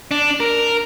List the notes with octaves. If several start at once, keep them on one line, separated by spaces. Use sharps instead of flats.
D4
A#4